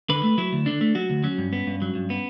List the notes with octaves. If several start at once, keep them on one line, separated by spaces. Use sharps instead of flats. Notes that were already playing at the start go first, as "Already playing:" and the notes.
D3 B4
A3
F#3 E4
D2
D3 D4
A3
F#3 F#4
D2
F#3 C#4
G2
B3
G2
F#3
G2
B3